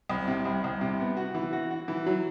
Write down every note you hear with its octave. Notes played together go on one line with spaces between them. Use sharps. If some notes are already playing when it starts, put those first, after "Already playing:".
C2
C3
C2
C2
C3
B3
F#4
E3
F#4
F#4
E3
F#3